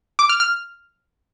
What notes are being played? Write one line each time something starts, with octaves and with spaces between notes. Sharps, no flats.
D6
F6
F6